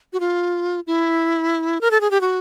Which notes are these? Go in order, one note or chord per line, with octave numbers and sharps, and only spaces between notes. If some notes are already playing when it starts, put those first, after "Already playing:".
F#4
F4
E4
A#4
A4
G#4
G4
F#4